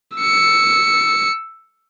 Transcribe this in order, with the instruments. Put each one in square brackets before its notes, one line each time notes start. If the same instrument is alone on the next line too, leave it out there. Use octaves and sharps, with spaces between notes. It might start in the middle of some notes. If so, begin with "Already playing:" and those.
[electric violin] E6 C#7